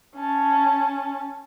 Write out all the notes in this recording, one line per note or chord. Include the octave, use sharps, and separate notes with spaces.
C#4 A5